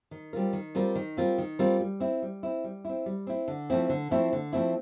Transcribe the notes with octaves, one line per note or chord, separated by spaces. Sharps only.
D#3
G3 C4 F4 A#4
D#3
G3 C4 F4 A#4
D#3
G3 C4 F4 A#4
D#3
G3 C4 F4 A#4
G3
C4 E4
G3
C4 E4
G3
C4 E4
G3
C4 E4
D3
F3 A3 C4 E4
D3
F3 A3 C4 E4
D3
F3 A3 C4 E4